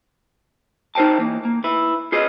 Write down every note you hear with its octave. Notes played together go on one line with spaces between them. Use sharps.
D#4 A#4 C5 G5 A5
E3 A#3
A#3
E4 B4
F4 G#4 B4 D#5